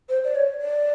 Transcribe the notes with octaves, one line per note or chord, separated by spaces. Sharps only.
C5
D5
C#5
D5